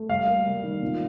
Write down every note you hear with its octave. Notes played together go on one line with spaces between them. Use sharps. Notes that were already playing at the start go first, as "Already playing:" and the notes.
Already playing: A3
G3 F5
A#3
G3
D#3
A#2